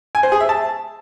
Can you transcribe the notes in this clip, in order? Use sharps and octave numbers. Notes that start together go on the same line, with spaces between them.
G#5
C5
G#4
E5
A5